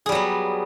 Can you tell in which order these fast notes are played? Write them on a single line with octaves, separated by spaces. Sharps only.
G#4 G3 F#3 B3